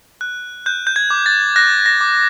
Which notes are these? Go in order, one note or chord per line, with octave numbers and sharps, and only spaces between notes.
F#6
F#6 G6
G6
G#6
D6
A6
F#6 A#6
A#6
D6